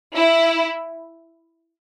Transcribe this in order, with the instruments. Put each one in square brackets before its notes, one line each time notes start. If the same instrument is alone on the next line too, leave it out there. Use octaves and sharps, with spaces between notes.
[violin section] E4